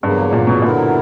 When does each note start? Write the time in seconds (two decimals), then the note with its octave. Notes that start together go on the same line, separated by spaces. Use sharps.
0.03 E2 G2 C#3 F#3 A#3
0.33 A#2
0.47 B2
0.62 A#2 D3 F#3 B3 E4 A#4